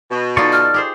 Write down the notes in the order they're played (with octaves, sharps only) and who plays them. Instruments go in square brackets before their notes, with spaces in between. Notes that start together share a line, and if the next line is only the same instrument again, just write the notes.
[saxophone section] B2
[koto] D#4 F4 [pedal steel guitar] A4 D5 C#6
[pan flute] F6
[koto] G4 G#4 C5